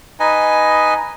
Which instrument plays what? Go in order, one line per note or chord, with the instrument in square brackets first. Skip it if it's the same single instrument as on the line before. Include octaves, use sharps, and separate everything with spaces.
[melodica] D#4 B4 D#5 G#5